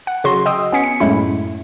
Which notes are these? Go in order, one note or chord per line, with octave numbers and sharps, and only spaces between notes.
F#5
C#3 F#3 F#4 C6 A#6
D#5 G5 D#6 E6
B3 C#4 G#5 B6 C#7
C#7
F#2 A2 G#3 A3 C#4 E4